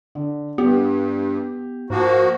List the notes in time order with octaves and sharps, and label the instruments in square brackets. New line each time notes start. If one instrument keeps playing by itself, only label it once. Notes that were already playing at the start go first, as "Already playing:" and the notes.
[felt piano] D3
[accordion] G2 [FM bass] B3 [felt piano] G4
[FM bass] G#2 [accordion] F3 A#3 F#4